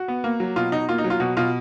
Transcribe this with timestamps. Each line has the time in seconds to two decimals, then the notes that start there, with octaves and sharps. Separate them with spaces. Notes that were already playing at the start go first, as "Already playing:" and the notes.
Already playing: F#4
0.08 B3
0.24 A#3
0.40 F#3
0.56 B2 F4
0.72 B2 D#4
0.89 A#3 F4
0.98 D#4
1.04 F#3
1.10 F4
1.20 B2 F#4
1.37 B2 F4